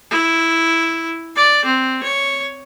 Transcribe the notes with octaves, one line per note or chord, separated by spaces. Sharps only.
E4
D5
C4
C#5